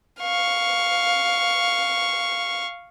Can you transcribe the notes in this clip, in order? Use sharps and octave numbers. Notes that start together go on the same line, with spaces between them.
F5 C#6